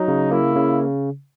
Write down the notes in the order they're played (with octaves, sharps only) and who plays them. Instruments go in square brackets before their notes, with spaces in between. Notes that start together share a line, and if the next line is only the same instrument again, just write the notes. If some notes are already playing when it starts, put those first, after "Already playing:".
Already playing: [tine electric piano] F#3 [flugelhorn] D#4
[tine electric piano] C#3
[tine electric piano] A#3 [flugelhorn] E4
[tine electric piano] C#3